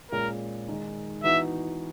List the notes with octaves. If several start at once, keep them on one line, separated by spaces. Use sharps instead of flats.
A#2 G#3 C#4 G#4 A#4
D#3 G#3 D#4
E3 B3 D#4 F#4 E5